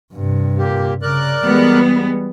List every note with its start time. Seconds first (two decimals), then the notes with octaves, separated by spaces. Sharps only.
0.14 G2 C3
0.58 A#2 A#3 G4
1.02 C#3 A#4 D5 F#6
1.45 E3 G3 G#3 B3